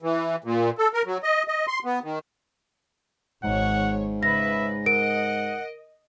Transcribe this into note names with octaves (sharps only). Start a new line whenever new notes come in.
E3
A#2
A4
A#4
F#3
D#5
D#5
C6
B3
D#3
G#1 G#2 C#5 F#5
C#3 B4 E5 A#6
A#4 D#5 F#5 D7